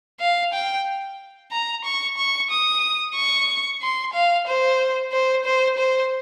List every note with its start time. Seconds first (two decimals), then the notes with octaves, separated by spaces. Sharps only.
0.20 F5
0.53 G5
1.52 A#5
1.84 C#6
2.17 C#6
2.50 D#6
3.15 C#6
3.82 C6
4.13 F5
4.47 C5
5.12 C5
5.45 C5
5.78 C5